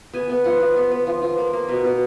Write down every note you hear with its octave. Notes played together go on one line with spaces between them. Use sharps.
B3 G#5
B3
F3 F#5
F3
B3
B3
F3
F3
A#3
A#3
B2
B2